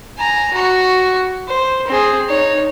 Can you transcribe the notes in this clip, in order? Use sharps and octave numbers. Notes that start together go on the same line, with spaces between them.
G#5 A#5
F#4 C#6
C5
C4 G#4
D#4 C#5